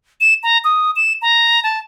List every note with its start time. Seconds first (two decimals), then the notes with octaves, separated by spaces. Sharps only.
0.21 E7
0.43 A#5
0.65 D#6
0.96 E7
1.22 A#5
1.63 A5